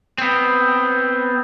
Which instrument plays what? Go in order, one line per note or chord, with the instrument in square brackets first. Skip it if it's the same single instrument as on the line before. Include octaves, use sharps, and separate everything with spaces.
[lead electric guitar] B3 C4